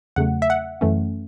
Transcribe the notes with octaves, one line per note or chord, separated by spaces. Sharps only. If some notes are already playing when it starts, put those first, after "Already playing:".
E2 C#3 F#3 A3 F#5
E5
F#5
F#2 E3 A3 C#4